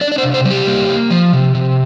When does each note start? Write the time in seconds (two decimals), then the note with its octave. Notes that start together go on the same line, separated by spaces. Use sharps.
0.01 D4 D5
0.12 D5
0.18 C5
0.23 C3
0.34 C5
0.45 G3
0.50 G4
0.67 A#3
0.89 A#3
1.11 F3
1.33 C3
1.55 C3